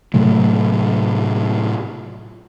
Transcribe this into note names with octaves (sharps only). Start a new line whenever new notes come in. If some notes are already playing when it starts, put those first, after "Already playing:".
A2 C3 F#3 A3